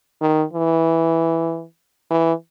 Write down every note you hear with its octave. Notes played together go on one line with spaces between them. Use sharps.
D#3
E3
E3